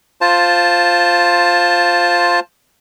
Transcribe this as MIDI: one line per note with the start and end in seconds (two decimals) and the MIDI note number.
0.21 2.40 65
0.21 2.40 72
0.21 2.40 81